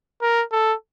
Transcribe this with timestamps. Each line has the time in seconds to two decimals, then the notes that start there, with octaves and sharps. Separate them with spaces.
0.22 A#4
0.52 A4